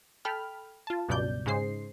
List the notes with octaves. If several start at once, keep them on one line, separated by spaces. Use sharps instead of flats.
A4 G5 B5 F6
F4 A5
C#2 G2 B2 F#3 D5 G6
G#2 C#3 G#3 G#4 C5 C7